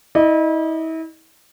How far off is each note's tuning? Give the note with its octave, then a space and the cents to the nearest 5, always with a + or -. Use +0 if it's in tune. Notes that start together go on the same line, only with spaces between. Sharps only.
E4 -40 D#5 -30